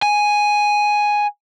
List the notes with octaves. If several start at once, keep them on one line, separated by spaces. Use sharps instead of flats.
G#5